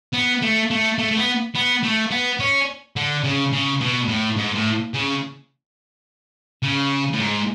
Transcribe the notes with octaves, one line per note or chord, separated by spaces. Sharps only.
B3
A3
A3
A3
A3
B3
B3
A3
B3
C#4
D3
C#3
C#3
B2
A2
G#2
A2
C#3
C#3
A2
G#2